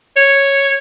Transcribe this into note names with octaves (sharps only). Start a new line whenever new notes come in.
C#5